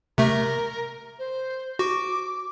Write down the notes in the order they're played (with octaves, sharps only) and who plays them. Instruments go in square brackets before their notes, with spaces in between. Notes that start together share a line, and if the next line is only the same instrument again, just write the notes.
[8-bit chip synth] C3 A3 [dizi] A#4
[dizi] C5
[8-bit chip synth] F#4 [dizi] D6